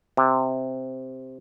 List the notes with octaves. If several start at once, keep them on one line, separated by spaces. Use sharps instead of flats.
C3